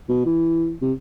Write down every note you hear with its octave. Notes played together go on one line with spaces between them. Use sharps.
B2
E3
C3